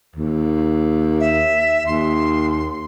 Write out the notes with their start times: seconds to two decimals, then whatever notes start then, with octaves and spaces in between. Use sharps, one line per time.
0.16 D#2
1.20 E5
1.86 D#2 C6